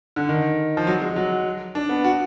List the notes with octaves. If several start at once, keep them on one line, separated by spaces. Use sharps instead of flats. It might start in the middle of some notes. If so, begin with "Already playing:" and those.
D3
D#3
F3
F#3
G#3
F#3
D4
B3
F#4